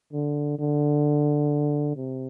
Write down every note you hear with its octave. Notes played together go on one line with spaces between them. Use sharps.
D3
D3
C3